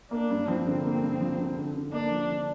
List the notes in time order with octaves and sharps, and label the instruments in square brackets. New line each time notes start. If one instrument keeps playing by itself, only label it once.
[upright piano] A#3 [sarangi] D4
[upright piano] G2
[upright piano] F3 [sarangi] C4
[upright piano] D3
A#3
G2
F3
D3
D3
D3
[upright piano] A#3 [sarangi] D4
[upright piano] F3
D3